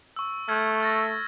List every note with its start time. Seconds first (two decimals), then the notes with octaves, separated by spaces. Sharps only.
0.16 C#6 E6
0.48 A3 F6 G#6
0.81 F6 A6 A#6